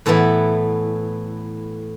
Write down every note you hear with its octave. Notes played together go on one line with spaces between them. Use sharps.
A2 E3 B3 E4 A4